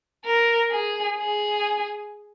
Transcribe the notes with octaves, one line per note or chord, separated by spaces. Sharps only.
A#4
G#4
G#4